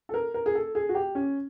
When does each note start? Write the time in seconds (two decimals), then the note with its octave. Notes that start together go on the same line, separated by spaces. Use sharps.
0.09 A4
0.14 A#4
0.34 A#4
0.46 G#4
0.55 A4
0.75 G#4
0.89 F#4
0.95 G4
1.15 C#4